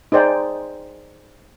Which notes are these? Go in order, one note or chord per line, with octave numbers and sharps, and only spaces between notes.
D#4 G#4 C5 D5 G5